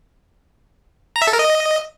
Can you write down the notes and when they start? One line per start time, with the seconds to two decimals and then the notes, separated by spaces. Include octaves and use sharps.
1.16 A#5
1.22 E5
1.27 A4
1.33 A#4
1.39 D#5